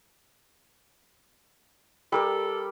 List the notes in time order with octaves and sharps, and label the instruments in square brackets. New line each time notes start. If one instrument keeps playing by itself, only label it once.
[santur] G3 A#4 D6 [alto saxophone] A4